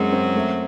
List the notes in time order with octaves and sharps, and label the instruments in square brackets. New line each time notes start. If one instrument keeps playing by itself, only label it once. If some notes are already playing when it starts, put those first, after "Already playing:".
Already playing: [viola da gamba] F#2 F#3 [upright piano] G#3 C4
[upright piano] C4
A3